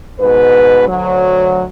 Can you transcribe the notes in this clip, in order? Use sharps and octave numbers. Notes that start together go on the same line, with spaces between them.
G#2 B2 B4
D2 F#3